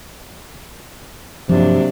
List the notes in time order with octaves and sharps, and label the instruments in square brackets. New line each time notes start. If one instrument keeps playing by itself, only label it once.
[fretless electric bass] G2 F3 [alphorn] C3 [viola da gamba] F#3 A#3 D4